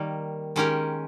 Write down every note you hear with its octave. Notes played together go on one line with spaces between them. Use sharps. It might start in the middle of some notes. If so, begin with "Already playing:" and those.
Already playing: D#3 G3 A#3
D#3 G#3 C#4 G4 A#4